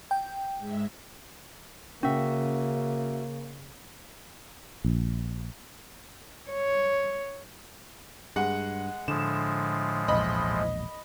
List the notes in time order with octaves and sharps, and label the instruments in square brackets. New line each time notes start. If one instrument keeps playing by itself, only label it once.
[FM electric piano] G5
[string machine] G#2 G#3 E5
[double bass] C#3 [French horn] A#3 [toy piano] C#4 [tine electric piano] F#4 E5
[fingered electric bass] A#1
[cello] C#5
[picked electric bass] G2 [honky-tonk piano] G#3 F#5
[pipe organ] A2 F3 G#3 [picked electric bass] D3 [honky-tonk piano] E7
[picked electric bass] E1 A#1 [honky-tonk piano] D#5 B5